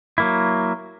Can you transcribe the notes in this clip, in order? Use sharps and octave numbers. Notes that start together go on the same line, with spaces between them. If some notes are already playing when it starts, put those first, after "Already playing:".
F#3 A#3 E4